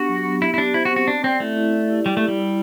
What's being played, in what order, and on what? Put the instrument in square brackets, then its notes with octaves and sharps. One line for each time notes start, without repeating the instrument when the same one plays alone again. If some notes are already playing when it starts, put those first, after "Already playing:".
Already playing: [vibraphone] B3 D4 G4 [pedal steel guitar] F#4
[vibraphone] F#3
B3
[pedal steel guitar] E4 [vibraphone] G4
[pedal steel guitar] E4
[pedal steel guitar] D4 [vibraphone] G4
[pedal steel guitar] E4 [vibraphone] C5
[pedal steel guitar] F#4
[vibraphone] C4
[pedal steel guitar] F#4
[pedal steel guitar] D4 [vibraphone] D5
[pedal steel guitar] C4 [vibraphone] D5
[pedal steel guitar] A3 [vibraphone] E4
[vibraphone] E4
D5
G4
[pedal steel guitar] G3 [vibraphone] G4
[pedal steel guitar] A3
[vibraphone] G4
[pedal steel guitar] G3
[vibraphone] E4